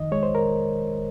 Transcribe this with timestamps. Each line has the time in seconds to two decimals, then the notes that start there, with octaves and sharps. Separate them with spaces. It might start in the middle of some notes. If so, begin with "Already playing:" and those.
Already playing: F2 D#3 D#5
0.12 G#3 C#5
0.23 C5
0.35 A#4